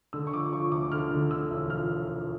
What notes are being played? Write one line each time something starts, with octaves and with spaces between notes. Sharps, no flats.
D3 E6
C#6
F3 D6
F3 C#6
D2 D6
D3 F6
D3
D3 E6
E1
F3 F6